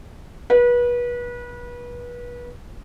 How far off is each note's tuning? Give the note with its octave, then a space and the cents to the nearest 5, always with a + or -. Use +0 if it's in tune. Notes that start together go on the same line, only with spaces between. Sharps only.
B4 -30